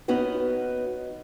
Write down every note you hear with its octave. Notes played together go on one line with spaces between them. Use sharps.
B3 C#4 D#4 F#4 B4